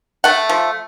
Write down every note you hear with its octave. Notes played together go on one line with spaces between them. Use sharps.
A3 F#5
F3